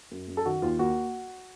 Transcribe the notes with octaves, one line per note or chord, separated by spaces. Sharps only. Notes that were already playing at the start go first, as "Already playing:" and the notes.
F#2
F#2
A4
D#3 F#4
D#2 F4
A#3 F#4